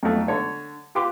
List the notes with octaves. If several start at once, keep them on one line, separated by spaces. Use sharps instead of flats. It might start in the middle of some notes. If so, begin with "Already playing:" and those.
F2 F#3 A3 D#4
D3 C#5 A5
F4 G4 B4 C6 D6